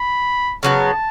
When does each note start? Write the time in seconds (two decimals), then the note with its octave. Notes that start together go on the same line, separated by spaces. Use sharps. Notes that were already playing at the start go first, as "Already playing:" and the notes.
Already playing: B5
0.63 C#3 F#3 B3 A5